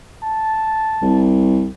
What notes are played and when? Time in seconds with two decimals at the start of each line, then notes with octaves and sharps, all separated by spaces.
0.23 A5
1.01 C2